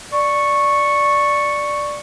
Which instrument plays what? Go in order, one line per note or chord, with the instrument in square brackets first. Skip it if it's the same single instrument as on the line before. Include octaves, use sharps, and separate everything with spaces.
[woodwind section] D5 C#6